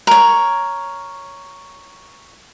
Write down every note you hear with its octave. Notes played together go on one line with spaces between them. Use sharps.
A#4 C#5